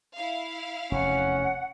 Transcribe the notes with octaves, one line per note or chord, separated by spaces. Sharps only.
E4 F5
F1 E2 C#4 F#5